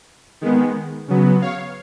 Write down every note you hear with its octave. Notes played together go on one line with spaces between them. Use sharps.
D#3 G#3 B3
C#3 F#3 B3
C#5 F5